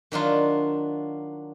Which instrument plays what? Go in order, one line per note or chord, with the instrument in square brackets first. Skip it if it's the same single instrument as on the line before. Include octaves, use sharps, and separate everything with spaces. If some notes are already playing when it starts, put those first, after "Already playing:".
[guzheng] D#3 F#3 D4 F4